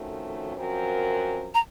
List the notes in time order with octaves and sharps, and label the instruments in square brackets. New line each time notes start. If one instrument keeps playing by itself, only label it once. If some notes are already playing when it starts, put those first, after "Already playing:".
Already playing: [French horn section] F2 D#3 A3 C#4 F#4
F#2 F3 C4 F#4 A#4
[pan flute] A#5